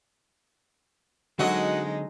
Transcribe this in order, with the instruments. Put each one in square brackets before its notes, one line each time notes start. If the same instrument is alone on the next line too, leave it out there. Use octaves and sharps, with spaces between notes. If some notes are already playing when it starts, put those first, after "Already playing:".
[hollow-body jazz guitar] D3 C4 G#4 [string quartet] F#3 G#3 D#4 [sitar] F#4 D#5